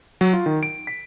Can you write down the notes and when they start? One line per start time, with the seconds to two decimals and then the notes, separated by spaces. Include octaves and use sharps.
0.21 F#3
0.33 F4
0.46 D#3
0.63 D7
0.87 B6